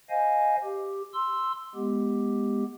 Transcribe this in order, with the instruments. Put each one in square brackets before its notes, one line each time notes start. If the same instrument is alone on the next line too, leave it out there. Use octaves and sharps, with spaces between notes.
[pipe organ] C5 D#5 F5 G#5
G4
C6 E6
G#3 B3 G4